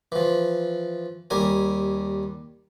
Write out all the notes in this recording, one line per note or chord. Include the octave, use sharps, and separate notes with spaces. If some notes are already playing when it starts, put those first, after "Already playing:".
E3 F3
D#2 G3 A#4 G#5